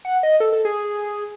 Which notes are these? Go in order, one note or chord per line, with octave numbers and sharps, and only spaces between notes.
F#5
D#5
A4
A4
G#4